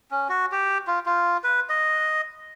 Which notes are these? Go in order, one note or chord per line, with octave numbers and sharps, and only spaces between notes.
C#4
F#4
G4
F4
F4
B4
D#5